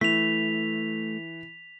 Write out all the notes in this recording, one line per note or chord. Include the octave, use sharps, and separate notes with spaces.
E3 A3 B6 F7